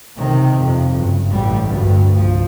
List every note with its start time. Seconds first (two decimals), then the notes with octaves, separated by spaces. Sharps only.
0.16 C3 D#3
0.55 F2 C3
0.91 F#1 G2
1.30 A1 G3
1.67 D2 G2
2.16 C2 F3